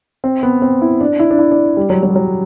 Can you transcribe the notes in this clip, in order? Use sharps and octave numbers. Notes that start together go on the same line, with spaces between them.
C4
B3
C4
E4
D4
E4
D4
E4
D4
G3
F#3
F#3
G3
F#3